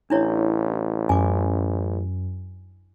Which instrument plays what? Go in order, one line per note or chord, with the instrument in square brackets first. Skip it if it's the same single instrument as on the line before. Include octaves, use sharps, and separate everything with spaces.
[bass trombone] A1 [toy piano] D4 E4 C#5
[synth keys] F#2 [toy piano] G#5 D6